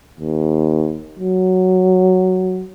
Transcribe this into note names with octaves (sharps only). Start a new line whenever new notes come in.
D#2
F#3